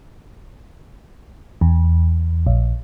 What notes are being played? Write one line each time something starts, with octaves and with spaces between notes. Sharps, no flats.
E2
A#1